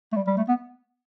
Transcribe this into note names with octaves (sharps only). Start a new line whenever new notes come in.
A3
G3
G3
A3
B3